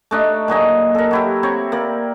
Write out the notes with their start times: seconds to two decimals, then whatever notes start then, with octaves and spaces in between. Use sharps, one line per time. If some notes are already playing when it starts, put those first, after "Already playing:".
0.11 A3 D4 D#4
0.48 A#2 F#3 D#5 G#5
0.95 A4 A#4
1.11 F#3 E4 G4
1.43 C4 C#5
1.72 A#3 D5